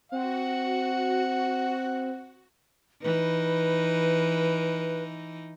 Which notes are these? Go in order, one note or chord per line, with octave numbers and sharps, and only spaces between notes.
C4 F#4 F#5
E3 D#4 B4